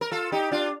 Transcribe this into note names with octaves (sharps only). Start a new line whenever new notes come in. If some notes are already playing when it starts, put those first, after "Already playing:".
A#4
F4 A4
D#4 G4
D4 F4